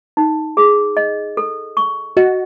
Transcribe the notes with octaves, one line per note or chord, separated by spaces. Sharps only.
D#4
G#4
D#5
A4
C#6
F#4 D#5